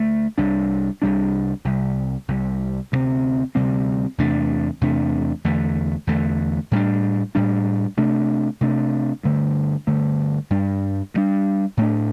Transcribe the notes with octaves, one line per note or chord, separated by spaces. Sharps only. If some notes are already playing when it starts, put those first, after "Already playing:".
Already playing: D2 A3
C2 C3 G3 D4
C2 C3 G3 D4
C2 C3 G3
C2 C3 G3
D2 C3 G3 C4
D2 C3 G3 C4
E2 C3 A3 D4
E2 C3 A3 D4
E2 D3 A3
E2 D3 A3
A2 G3 D4
A2 G3 D4
C3 A3 D4
C3 A3 D4
G2 D3 A3
G2 D3 A3
G2 G3 D4
G2 G3 D4
A2 A3 D4